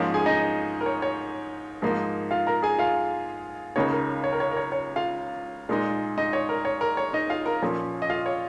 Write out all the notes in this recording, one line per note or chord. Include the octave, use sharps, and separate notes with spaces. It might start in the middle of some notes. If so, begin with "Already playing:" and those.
Already playing: G#2 F3 A#3 C#4 A#4 A#5
G#4 G#5
D#4 D#5
A#4
C#5
C#5
G#2 F3 A#3 D#4
F4 F5
A#4 A#5
G#4 G#5
F4 F5
C#2 C#3 A#3 D#4 C#5
A#4
C#5
A#4
C#5
A#4
C#5
C#5
F4 F5
A#2 G#3 D#4
D#4 D#5
C#5
A#4
C#5
A#4
C#5
D#4 D#5
F4 F5
A#4 A#5
A#2 F3 C#4
D#5
F4 F5
C#5